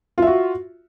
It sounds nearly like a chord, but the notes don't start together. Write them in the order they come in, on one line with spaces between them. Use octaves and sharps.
F4 E5 F#4